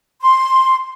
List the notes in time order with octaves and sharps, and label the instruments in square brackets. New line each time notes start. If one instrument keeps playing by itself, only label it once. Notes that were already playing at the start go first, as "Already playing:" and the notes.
[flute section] C6